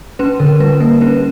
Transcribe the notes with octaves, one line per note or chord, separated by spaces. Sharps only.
C#4 B4
D3 A#4
G3 B4
A#3 B4
C#4 B4